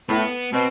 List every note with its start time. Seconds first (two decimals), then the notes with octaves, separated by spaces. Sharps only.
0.09 A2 B3
0.53 B2 C4